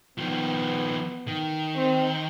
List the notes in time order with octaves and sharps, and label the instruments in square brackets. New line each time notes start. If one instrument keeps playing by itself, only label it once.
[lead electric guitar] D#3 F3 [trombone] B3
[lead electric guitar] D#3
[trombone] C4